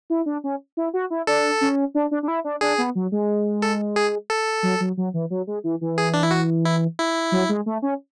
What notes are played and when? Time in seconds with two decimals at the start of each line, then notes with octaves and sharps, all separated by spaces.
0.10 E4
0.26 D4
0.44 C#4
0.77 E4
0.94 F#4
1.10 E4
1.27 D4 A4
1.61 C#4
1.95 D4
2.11 D4
2.23 D4
2.28 E4
2.44 D4
2.61 D4 G#4
2.78 B3
2.95 F#3
3.12 G#3
3.62 A4
3.96 G#4
4.30 A4
4.63 F#3
4.80 F#3
4.97 F#3
5.14 E3
5.30 F#3
5.47 G#3
5.64 E3
5.81 E3
5.98 G#4
6.14 D4
6.23 E4
6.31 F#4
6.65 E4
6.99 E4
7.32 F#3
7.49 G#3
7.66 A3
7.82 C#4